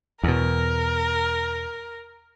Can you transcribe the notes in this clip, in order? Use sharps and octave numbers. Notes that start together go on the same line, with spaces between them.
E2 B2 A#4